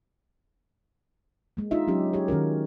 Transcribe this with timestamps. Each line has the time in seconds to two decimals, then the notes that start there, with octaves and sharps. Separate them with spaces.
1.57 G#3 A#3
1.71 D4 D#4 F4 D#5 E5
1.88 F#3 C#4 G4
2.13 G4 G#4 C#5
2.28 D#3 C#4 F#4 A#4